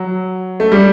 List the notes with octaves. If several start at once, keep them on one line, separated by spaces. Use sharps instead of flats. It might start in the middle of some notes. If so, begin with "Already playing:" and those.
Already playing: F#3
A3
G3